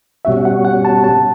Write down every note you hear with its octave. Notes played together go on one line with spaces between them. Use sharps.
B2 G3 C#4 F#4 E5
F#5
F#5
A5
A5